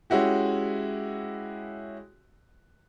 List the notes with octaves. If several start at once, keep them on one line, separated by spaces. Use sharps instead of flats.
G#3 C#4 E4 F#4 G4